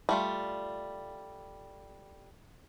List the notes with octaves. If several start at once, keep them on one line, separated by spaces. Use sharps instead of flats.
G3 A3 F4